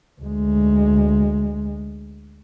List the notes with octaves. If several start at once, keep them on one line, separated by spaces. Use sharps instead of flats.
D2 G#3